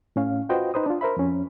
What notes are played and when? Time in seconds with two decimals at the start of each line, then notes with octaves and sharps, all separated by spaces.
0.16 A2 C#4 F5
0.49 F4 F#4 B4 C5 D#5 G5
0.74 D#4 B4 C5 D#6
0.86 D4 F4
1.01 A#4 C5 E5 B5
1.17 F2 C#4